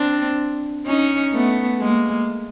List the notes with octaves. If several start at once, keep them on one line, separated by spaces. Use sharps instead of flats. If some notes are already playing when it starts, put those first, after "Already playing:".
Already playing: C4 D4
C#4 D#4
A3 B3
G#3 A#3